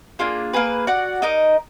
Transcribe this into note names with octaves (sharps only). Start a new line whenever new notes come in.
A#3 D4 F4 G#4
A#3 D#4 G#4 B4
F#4 D5 F#5
D#4 A#4 D#5